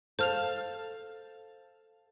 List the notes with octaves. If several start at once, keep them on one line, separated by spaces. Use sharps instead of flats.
A4 C5 F5 F6 F7